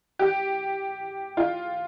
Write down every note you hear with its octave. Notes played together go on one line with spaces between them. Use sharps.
G4
F4